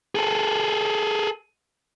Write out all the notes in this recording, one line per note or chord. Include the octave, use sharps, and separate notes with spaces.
G#4 A4